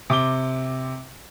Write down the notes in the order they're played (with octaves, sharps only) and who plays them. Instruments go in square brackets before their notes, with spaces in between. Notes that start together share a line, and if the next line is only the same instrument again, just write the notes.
[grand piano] C3 D6 G7